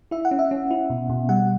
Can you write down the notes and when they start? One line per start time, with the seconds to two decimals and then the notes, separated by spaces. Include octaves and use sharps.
0.11 E4 E5
0.25 F#5
0.31 C#4
0.39 E5
0.51 C#4
0.71 E4
0.90 B2
1.09 B2
1.29 G3 F#5